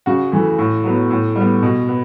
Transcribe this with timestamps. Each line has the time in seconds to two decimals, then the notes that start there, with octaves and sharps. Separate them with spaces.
0.06 C#3 F#4
0.32 E3 A3
0.59 A2
0.84 F#3 B3
1.10 A2
1.36 G3
1.41 B3
1.62 B2
1.89 B3